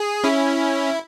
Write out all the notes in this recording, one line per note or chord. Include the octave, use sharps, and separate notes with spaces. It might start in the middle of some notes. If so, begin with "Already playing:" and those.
Already playing: G#4
C#4 E4